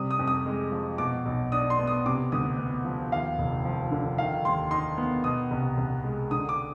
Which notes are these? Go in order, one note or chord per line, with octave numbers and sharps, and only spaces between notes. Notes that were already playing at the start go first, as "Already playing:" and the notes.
Already playing: C3 G3 D#6
D#6
F2
D#6
G#3
F3
B2 D6
B1
D4 D#6
C6
B3
D#6
C3 D6
D2 D#6
B3
F3
D#2 F5
F1
F3
D3
D#3 F5
D#2 C6
D#4 C6
B3
B2 D#6
C2
C2
G#3
D3 D#6
D6